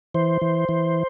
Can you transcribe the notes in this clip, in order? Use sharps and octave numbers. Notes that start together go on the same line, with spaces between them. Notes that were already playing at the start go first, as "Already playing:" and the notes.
E3 C5
E3
E3